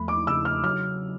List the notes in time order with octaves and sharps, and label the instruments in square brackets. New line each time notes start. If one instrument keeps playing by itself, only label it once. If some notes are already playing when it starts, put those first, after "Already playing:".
Already playing: [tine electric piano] E2 F3 A3 [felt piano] B5
[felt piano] D6
[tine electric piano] C#3 [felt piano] E6
[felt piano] F6
[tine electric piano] F#3 [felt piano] F6